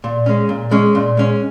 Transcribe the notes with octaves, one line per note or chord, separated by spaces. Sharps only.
A#2
G#3 C#4
A#2
G#3 C#4
A#2
G#3 C#4